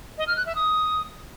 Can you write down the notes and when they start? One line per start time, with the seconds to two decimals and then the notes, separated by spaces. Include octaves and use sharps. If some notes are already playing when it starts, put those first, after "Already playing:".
0.18 D#5
0.27 F6
0.37 F#6
0.46 E5
0.55 D#6